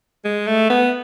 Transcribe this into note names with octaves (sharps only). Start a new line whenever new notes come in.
G#3
A3
B3